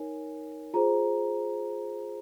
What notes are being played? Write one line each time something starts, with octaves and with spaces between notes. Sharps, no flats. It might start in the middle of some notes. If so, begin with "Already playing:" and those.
Already playing: D#4 A#4 C#5 G#5
F4 G#4 C5 A#5